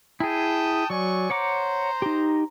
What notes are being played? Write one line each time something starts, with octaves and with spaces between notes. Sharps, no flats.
E4 G#4 G5 A5 D#6
F#3 D5 G#5 C#6
C5 C#5 F#5 A#5 D6
D#4 G4